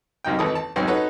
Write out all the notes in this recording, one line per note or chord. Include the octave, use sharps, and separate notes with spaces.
C2 F#2 D#4 G5
G#1 E3 A4 D#6
A5
B1 G#2 C4 C#4 C5 E6
D#4 F#4 A4 B4 C#5